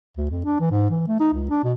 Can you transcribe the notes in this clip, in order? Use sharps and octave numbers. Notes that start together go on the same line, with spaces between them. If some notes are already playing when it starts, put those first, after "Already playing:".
D2
F2
D4
E3
G#2
E3
A3
D#4
C#2
D4
B2